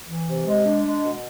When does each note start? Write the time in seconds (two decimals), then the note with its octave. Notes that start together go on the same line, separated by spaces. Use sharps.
0.08 E3
0.27 C3
0.46 G#3
0.65 D4
0.85 G#3
1.04 B2